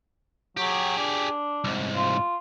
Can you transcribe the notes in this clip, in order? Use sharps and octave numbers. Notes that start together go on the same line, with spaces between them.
F#3 G4 G#4
D4
C2 G#2
F4